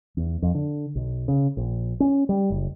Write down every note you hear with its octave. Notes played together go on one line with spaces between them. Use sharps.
E2
F2
D3
B1
C#3
A#1
C#4
G3
F#1